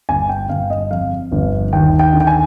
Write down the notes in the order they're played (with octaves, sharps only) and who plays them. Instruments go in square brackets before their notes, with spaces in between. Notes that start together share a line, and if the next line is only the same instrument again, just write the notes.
[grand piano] G1 G#5
G5
G1 F5
D#5
F2 F5
G1
D#2 G5
G5
D3
G5
G#5